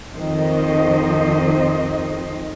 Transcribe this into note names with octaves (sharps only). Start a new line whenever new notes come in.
F2 D#3 C5 D#5